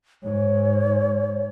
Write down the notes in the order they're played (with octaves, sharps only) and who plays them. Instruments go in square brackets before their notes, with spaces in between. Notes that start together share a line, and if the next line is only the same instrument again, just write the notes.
[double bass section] G#2 [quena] C#5